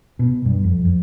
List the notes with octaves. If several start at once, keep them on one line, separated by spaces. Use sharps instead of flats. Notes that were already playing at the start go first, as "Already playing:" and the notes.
B2
G2
F2
F2